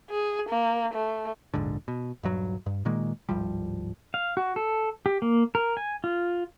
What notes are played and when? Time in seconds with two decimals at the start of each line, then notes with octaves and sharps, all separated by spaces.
0.10 G#4
0.49 A#3
0.94 A3
1.54 E1 A#1 G#2 D3
1.88 B2
2.23 D#1 G2 F#3
2.66 G2
2.85 A#2 D#3 G#3 A#3
3.29 D1 G#1 F3 G3
4.14 F5
4.37 F#4
4.56 A4
5.06 G4
5.22 A#3
5.55 A#4
5.77 G#5
6.04 F4